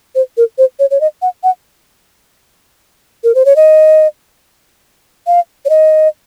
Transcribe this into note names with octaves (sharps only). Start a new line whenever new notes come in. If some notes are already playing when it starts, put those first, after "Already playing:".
C5
A#4
C5
C#5
C#5
D#5
F#5
F#5
A#4
C5
C#5
D#5
F5
C#5
D#5